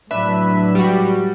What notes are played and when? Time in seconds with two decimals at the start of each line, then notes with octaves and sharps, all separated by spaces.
0.11 A2 F#3 D4 B4 E5
0.75 G3 F#4